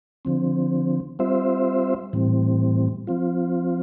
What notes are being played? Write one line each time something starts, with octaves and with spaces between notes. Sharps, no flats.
D3 F3 C4
G3 C4 F4 C5 E5
A2 E3 G3 C4
F3 C4 F4